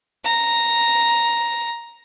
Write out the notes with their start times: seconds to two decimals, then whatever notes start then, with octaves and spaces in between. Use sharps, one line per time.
0.24 A#5